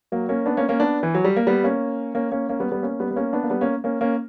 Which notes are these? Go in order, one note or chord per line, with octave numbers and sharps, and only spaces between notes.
F#3 A#3
A#3 C#4
B3 D4
A#3 C#4
A#3 C#4
B3 D4
E3
F#3
G3
A#3
G3 B3
A#3 C#4
A#3 C#4
A#3 C#4
A#3 C#4
G3 B3
G3 B3
A#3 C#4
G3 B3
B3
A#3 C#4
B3 D4
A#3
G3 B3
A#3 C#4
A#3 C#4
A#3 C#4